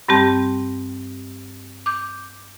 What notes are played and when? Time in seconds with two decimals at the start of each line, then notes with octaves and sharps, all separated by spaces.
0.08 G2 G3 C4 G4 A5
1.86 D6 G6